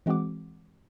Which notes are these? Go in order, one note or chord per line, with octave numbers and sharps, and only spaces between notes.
E3 G#3 C4 F#4 F#5 D6